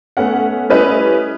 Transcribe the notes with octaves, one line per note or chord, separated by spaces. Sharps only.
A3 B3 C#4 F#5
G3 A3 C#4 E4 B4 D#5